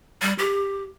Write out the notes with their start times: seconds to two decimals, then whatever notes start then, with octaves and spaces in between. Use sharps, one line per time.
0.22 G3
0.39 G4